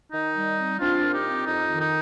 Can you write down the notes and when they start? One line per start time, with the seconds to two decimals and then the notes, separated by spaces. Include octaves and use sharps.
0.11 D#3 D#4
0.34 G3
0.56 C4
0.79 C4 D4 F4
1.01 A#2
1.13 D#4 G4
1.23 C4
1.46 F2 D#4
1.69 D#3
1.80 D#4